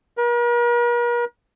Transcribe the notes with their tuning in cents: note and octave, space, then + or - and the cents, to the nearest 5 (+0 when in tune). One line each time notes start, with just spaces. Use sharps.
A#4 +45